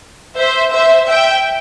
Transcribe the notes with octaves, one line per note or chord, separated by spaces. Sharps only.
C5 E5
C5 E5
E5 G5